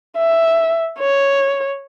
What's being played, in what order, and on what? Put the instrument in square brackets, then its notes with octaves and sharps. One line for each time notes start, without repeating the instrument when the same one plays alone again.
[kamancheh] E5
C#5